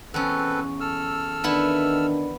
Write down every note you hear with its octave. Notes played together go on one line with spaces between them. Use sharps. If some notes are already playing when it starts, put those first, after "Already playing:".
E2 C4 C#4 A4 B4
A4 E6 F6
D#3 B3 D4 E4